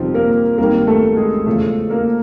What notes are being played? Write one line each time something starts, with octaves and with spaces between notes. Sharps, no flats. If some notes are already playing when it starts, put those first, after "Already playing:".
Already playing: G1 F2 C3 D#3 F3 G3 F4
A#3 A#4
G#1 G2 D#3 A#3 A#4
A3 A4
G#3 G#4
E2 C#3 F3 G#3 A3 A4
A#3 A#4